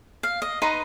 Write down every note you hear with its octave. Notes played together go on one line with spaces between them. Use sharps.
F5
D#5
D#4 B4 A#5 C6